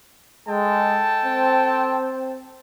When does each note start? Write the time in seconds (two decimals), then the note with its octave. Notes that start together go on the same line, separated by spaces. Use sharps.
0.48 G#3 A4 G5 A5
1.25 C4